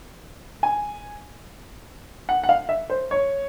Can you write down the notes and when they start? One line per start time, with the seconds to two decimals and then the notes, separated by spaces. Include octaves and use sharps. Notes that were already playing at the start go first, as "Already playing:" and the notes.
0.63 G#5
2.29 F#5
2.44 F#5
2.49 F5
2.69 E5
2.90 C5
3.11 C#5